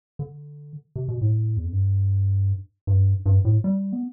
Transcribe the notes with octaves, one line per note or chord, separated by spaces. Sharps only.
D3
C3
B2
A2
E2
F2
G2
G2
G2
A2
G3
B3